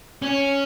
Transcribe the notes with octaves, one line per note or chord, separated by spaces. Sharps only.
C#4